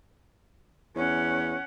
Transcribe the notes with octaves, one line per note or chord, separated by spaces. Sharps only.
E2 C#4 F#5